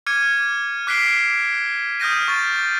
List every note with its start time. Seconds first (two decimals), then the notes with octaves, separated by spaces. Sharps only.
0.06 D6 F6 G#6 C#7 D#7
0.87 D6 F#6 B6 C7 D7 G7
2.00 D#6 F6 G6 A#6 D#7
2.28 C#6 A6